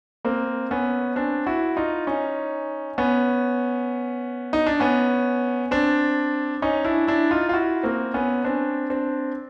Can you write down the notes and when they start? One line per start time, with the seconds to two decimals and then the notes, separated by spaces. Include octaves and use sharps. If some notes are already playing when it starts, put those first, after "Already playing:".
0.25 A#3 C4
0.71 B3 C#4
1.16 C4 D4
1.46 E4 F#4
1.76 D#4 F4
2.07 C#4 D#4
2.98 B3 C#4
4.53 D#4
4.66 D4
4.80 B3 C#4
5.71 C4 D4
6.62 C#4 D#4
6.85 D4 E4
7.07 D4 E4
7.31 D#4 F4
7.49 F4
7.53 E4 F#4
7.83 A#3 C4
8.14 B3 C#4
8.44 C4 D4
8.90 C4 D4